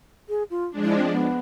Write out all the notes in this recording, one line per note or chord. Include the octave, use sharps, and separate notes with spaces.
G#4
F4
F3 G#3 D4
E4
C4
B3